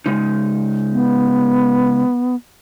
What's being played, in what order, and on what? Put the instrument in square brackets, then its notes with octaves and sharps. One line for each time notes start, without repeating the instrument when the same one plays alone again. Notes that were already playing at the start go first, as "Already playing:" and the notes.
[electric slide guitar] C#3 G#3 D#4
[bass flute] B3